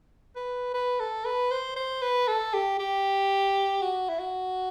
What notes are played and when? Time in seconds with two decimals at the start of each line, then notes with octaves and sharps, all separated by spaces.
0.35 B4
0.74 B4
0.99 A4
1.24 B4
1.51 C5
1.76 C5
2.02 B4
2.28 A4
2.54 G4
2.79 G4
3.81 F#4
4.09 E4
4.19 F#4